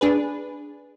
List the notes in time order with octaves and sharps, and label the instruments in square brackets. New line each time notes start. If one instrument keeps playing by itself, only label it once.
[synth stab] D4 G#4 B4